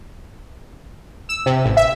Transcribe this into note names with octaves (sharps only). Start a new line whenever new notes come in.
E6
C3
A1
E5